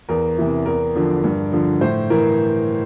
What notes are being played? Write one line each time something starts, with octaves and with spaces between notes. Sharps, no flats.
E2 A#4
C3 E3
E2 A#4
D3 F3
G2
D3 F3
A2 C5
E3 A#4